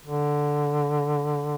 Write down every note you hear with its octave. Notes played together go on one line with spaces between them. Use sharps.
D3